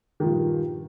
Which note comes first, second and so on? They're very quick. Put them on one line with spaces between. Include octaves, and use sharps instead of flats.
D#3 F3 A#2 G2